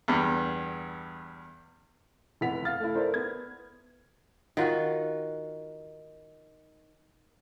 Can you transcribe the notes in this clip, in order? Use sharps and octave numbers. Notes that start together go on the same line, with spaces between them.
E2 G2
F1 B3 E4 F#5 B6 F7
F5 F6 A6
A3 E4
E4 A4 A#4 C5 D5
B3 G#6
D#3 F4 F#4